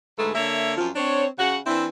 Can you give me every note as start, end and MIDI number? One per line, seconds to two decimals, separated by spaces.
0.19 0.32 38
0.19 0.32 44
0.19 0.32 56
0.19 0.32 57
0.19 0.32 69
0.19 0.32 71
0.35 0.72 50
0.35 0.72 58
0.35 0.72 73
0.35 0.72 76
0.77 0.89 42
0.77 0.89 53
0.77 0.89 60
0.77 0.89 65
0.96 1.26 60
0.96 1.26 62
0.96 1.26 72
0.96 1.26 73
1.38 1.58 49
1.38 1.58 66
1.38 1.58 78
1.67 1.87 52
1.67 1.87 60
1.67 1.87 62
1.67 1.87 64